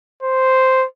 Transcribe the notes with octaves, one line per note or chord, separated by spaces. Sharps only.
C5